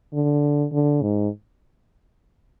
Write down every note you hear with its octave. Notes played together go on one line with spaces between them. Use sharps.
D3
D3
G#2